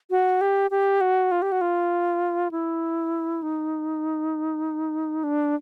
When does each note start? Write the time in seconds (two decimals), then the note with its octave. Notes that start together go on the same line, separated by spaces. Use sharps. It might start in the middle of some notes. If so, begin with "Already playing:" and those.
0.10 F#4
0.41 G4
0.71 G4
1.01 F#4
1.32 F4
1.42 G4
1.52 F#4
1.61 F4
2.51 E4
3.42 D#4
5.24 D4